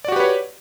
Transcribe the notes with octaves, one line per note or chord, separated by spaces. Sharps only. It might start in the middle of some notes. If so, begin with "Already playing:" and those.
F#4 G4 B4 C#5 D5